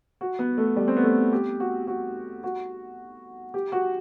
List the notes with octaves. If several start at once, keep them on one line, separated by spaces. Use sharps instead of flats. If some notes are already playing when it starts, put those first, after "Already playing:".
F#4
B3
A3
G3
C4
B3
A3
G4
F#4
F#4
F#4
G4
F#4